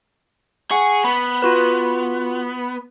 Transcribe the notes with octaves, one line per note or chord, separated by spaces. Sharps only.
G#4 F#5 C#6
B3 B5
F4 F#4 B4